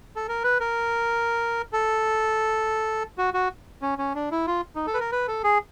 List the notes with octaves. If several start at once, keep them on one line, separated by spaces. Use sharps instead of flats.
A4
A#4
B4
A#4
A4
F#4
F#4
C#4
C#4
D4
E4
F4
D#4
A4
B4
A#4
B4
A4
G#4